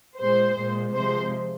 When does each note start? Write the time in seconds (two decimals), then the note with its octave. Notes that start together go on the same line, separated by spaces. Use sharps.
0.19 A#2 G#3 C5
0.57 A#2 G#3
0.94 C3 F3 G#3 C5